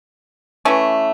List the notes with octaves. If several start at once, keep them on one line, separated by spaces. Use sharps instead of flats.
E3 A3 C#4